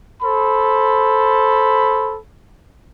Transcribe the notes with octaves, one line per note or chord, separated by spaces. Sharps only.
A4 C5 B5